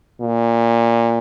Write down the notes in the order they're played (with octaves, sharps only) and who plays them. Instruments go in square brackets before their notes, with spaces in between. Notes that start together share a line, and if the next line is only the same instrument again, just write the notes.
[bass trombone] A#2